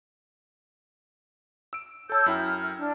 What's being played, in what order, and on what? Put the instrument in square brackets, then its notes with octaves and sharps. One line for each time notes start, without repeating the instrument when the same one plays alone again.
[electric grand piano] E6 D7
[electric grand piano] A4 A5 [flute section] C#5 E6 G6
[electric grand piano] F#2 E4 G5 [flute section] F6
[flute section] D4